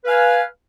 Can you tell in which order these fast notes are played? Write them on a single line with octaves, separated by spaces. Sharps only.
B4 F5 G#5